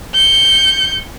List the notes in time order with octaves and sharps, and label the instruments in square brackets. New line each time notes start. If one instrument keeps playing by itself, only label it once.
[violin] G6 C#7